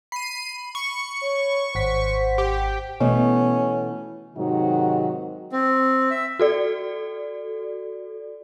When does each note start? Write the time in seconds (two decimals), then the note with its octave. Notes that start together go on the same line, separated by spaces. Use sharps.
0.12 B5 C7 D#7
0.75 C#6
1.22 C#5
1.75 G#1 C5 F#5 B6
2.38 G4
3.00 B2 E3 A3 C#4
4.36 G#2 C3 D#3 F#3 D#4 F#4
5.52 C4
6.10 E5
6.40 F#4 A4 D5